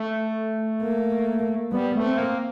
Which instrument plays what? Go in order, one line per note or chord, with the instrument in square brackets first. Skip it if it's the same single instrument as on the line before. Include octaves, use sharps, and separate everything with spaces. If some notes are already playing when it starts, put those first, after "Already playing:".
Already playing: [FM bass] A3
[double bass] A#3
[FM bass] G3 [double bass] B3
[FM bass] A3
[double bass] C4
[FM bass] A#3